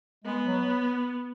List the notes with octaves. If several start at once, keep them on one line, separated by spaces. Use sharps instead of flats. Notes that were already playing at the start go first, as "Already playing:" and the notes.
G#3 B3
F#3